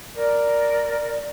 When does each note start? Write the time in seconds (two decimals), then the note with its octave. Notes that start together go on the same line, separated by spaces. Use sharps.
0.14 A#4 D5